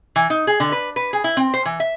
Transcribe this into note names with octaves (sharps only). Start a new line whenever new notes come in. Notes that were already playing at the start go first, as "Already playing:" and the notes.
E3
D#4
G#4
D3
B4
B4
G#4
E4
C4
C5
E3
E5